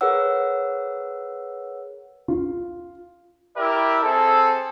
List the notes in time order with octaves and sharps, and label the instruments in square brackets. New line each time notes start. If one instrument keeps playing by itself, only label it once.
[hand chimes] G#4 A#4 B4 C#5 F#5 E6
[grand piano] F4
[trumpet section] E4 G4 A#4 D5 E5
C4 G#4 A4